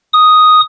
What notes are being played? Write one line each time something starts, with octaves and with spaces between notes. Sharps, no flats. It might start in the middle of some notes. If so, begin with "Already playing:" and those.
D#6